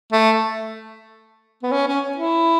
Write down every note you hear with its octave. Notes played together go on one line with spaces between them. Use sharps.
A3
B3
C#4
C#4
E4